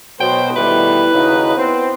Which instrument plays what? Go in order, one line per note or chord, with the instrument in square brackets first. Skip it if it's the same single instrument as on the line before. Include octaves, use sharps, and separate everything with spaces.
[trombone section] B2 [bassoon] F#3 [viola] C5 [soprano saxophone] G5
[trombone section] B2 D#3 G3 [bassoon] A3 [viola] E4 [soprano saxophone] B4
[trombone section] D#2 D#4 F#4 [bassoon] C#3
[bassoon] B3 [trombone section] C4 C5